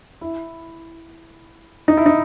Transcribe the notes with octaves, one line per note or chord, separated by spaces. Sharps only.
E4
D#4
E4
D#4